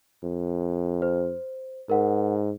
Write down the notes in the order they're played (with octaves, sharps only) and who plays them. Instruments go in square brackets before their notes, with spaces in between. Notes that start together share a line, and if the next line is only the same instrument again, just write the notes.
[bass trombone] F2
[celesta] C5
[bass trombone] G#2 [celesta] A#4 F#5